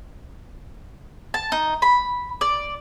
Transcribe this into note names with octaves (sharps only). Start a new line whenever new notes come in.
A5
D#4
B5
D5